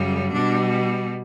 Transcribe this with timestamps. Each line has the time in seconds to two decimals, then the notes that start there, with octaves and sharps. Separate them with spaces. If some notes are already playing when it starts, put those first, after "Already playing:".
Already playing: F#2 C#3 G3
0.32 B2 G3 D4